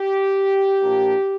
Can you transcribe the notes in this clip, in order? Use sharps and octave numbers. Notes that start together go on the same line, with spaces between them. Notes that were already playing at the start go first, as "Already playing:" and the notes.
Already playing: G4
A#2 F3 A#3 D4